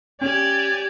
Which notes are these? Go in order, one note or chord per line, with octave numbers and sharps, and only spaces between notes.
C#4 G4 D5 G#5